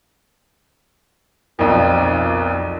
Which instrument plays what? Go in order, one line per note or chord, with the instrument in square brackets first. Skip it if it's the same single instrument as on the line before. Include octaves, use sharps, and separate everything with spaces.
[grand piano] B1 F2 [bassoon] A#2